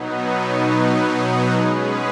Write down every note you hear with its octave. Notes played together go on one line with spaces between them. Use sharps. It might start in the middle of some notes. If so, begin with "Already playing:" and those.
Already playing: B2 F#3 B3 D#4
G#3 C#4 G#4 B4